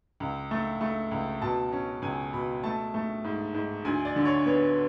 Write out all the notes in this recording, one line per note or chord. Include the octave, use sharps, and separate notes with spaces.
C#2
A3
A3
C#2
B2 A5
C#4
C#2 G#5
B2 B5
A3 A5
A3
G#2
G#2
D2 G#5
D5
D3
C#5
B3 C#5